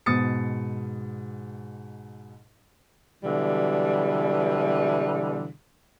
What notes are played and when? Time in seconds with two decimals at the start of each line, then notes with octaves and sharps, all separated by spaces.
0.06 G#2 B2 D#6 A6 C#7
3.23 B2 D3 E3 F#3 G3